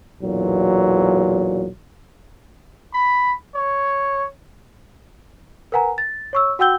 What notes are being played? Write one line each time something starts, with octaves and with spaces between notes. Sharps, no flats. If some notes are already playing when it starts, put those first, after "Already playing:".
B1 E2 A#2 F#3
B5
C#5
A#4 B4 F#5 G#5 A#5
A6
C#5 C#6 E6
F#4 F#5 G5 E6 G6 G7